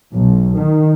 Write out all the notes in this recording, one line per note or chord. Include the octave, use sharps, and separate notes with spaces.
B1
D#3